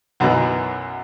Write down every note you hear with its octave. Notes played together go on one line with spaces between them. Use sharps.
B1 F#2 B2 E3